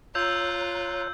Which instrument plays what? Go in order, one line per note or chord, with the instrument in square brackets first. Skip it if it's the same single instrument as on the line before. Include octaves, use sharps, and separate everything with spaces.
[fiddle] F4 [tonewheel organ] C#5 A#5 F#6 [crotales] E6 G6